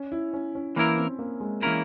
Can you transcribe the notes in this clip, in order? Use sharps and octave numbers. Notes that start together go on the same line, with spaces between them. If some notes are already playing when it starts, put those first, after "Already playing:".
Already playing: C#4
E4
C#4
C#4
E3 A#3 C#4 E4 A#4
C4
A#3
G#3
E3 G#3 A#3 C#4 E4 A#4